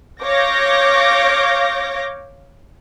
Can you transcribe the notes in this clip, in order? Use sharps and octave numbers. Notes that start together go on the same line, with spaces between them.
C#5 F5 D6 G6 A#6